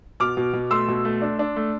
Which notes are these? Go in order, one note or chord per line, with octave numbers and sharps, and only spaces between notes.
B2 D6 F6
B2
B2
A3 C6 E6
B2
A3
D4
D4
A3